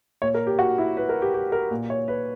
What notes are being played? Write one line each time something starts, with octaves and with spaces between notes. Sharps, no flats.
A#2 C#5
A#4
G4
F#4
E4
B4
A#4
G4
G4
A#4
A#2
C#5
B4